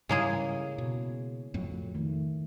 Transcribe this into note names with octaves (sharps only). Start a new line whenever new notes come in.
G#2 C#3 G3 G#3 A#3 E4 G#4 C#5
B2
F2 A2 F#3
D#3 A3